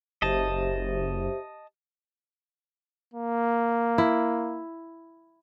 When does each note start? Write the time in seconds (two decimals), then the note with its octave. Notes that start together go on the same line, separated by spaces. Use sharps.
0.22 F#1 G4 C5 D#5 E5 A5
3.14 A#3
3.98 E4